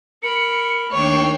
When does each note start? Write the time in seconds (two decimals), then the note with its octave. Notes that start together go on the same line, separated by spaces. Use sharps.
0.22 A#4 B5 C#7
0.91 D#2 A3 D4 C#5 G5 C#6 C7